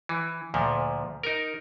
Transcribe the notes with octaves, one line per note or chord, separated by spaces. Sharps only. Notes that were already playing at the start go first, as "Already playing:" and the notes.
E3
D2 A#2 F3
D#4 A#4